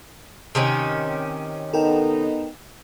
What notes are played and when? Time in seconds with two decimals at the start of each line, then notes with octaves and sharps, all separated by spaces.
0.55 C3 D#3 C#4
1.73 B3 D#4 A4 A#4 G5